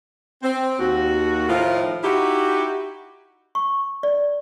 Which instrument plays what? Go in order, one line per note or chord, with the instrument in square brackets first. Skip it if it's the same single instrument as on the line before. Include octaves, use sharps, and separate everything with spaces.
[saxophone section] C4
D#2 F#4
A2 D#3 F3 F4
D#4 E4 F#4 G4
[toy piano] C#6
D5